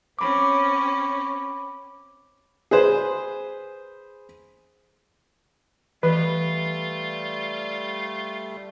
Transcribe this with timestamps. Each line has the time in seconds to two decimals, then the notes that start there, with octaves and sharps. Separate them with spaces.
0.19 C4 C#4 B5 D6
2.71 G#4 B4 C5
6.03 E3 G3 A3 F4 B4